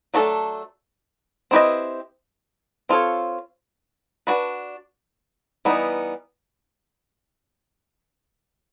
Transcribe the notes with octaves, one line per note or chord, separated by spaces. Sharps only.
F#3 A3 D4 F#4 A4
C4 E4 G4 B4 D#5
C4 F4 A4 C#5
D4 F#4 B4
E3 G3 B3 D#4